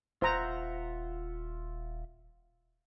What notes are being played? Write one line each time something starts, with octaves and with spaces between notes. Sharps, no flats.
D#1 F4 C5 E5 F#5 A#5